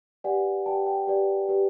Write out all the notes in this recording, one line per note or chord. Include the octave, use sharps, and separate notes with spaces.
G4 B4 D5 F#5 G#5
G4 B4 D5 G5 A5
G5 A5
G4 B4 D5
G4 B4 D5